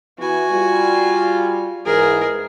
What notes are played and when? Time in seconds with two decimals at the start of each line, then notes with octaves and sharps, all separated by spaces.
0.18 E3 B3 F#4 G#5
0.50 G3 F4
1.86 G#2 E3 G#4 A#4